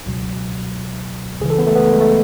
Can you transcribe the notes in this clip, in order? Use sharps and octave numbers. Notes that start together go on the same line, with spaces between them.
C#2 B2 F#3
C#2 C#3 E3 G#4
A4
B3
A3
B3
A3
G#3
A3